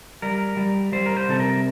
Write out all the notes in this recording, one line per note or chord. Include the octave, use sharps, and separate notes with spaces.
G3 A#4
G3
G3 C5
A#4
C5
C3 A4
A#4